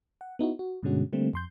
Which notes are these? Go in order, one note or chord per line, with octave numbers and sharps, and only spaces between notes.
F#5
B3 D#4 E4 F#4
F#4
G2 B2 D3 G#3 C#4 F#4
D3 G3 A3 A#3 C4
F2 C6 G6